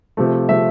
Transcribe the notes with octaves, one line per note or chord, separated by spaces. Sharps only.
C3 F3 A3
C3 F3 A3 E5